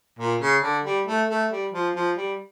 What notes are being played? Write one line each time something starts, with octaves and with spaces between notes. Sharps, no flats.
A#2
C#3
D3
G3
A3
A3
G3
F3
F3
G3